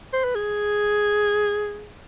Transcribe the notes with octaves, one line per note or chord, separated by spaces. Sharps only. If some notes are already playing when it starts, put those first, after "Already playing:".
C5
B4
G#4